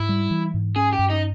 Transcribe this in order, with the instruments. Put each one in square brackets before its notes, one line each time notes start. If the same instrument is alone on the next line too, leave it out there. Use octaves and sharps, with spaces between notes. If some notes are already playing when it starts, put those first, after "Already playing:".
Already playing: [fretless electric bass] G#2 [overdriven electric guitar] E4
[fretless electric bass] G3
E3
G#2
[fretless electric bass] C#4 [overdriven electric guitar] G#4
[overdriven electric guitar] G4
[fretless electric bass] G2
[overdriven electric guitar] D#4